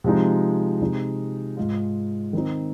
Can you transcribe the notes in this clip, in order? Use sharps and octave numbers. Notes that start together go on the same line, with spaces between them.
C3 F3 G#3 D#4
C3 G#3 D#4
G#2 G#3 F4
D#3 C4 D#4